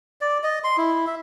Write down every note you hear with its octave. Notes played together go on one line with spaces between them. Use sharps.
D5
D#5
C6
E4
E5